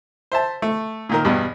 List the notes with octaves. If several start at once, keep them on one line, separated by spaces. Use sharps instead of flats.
C5 E5 A5
A3
A#2 D#3 A#4
E2 G2 B2